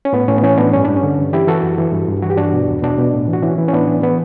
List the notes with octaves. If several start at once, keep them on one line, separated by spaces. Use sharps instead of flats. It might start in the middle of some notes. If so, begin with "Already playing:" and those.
C#4
A2 B3
A2 C#4
B3
E3 C#4
A2 B3 D4
G2 C#4
G2 D4
C#4
D3
G2
E3 E4 G4
E3 F#4 A4
F#2
E3
G2
G2
E3 F#4
G4
G2 D4 F#4
B2
E2
B2 D4 F#4
B2
A2
E3
F#4
E3 C#4 E4
E3
C#4
A2 B3 D4
E3
E3 B3